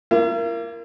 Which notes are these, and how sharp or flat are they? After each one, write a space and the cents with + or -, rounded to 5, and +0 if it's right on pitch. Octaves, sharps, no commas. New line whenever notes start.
A#3 +0 E4 +45